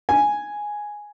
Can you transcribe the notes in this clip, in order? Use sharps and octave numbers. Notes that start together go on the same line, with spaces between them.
G#5